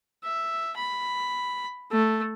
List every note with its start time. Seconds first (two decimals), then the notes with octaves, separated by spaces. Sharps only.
0.24 E5
0.77 B5
1.92 A3